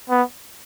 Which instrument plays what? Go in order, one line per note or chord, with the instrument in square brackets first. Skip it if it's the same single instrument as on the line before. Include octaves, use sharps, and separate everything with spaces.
[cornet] B3